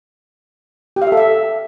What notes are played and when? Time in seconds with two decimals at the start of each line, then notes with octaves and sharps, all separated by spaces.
0.96 G4
1.02 F5
1.07 E5
1.12 A4
1.17 E5